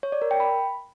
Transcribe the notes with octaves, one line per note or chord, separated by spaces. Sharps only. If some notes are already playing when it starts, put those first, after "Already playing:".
C#5
D5
A#4
G5
B5